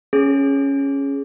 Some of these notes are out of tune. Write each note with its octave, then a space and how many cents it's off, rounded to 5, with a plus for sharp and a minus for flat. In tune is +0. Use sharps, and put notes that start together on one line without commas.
C#4 +0 G#4 +5